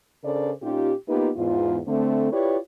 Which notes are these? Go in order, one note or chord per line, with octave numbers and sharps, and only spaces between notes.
C#3 D4 A4 A#4 C5 D5
A#2 C#4 D#4 F4 G4
A#3 B3 D#4 F4 G4 B4
E2 G#2 F4
D3 A3 C4
E4 F4 G4 B4 C#5 D5